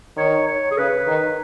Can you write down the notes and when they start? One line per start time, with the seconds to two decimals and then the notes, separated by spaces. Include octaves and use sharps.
0.17 D#3 C#5
0.47 C#5
0.71 G#4
0.77 C#3 B4
1.07 D#3